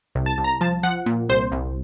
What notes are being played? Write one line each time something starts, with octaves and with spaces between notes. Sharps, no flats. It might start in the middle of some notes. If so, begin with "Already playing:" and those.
C2
A5
C2
A#5
F3 A5
F3 F#5
A#2
C2 C5
C2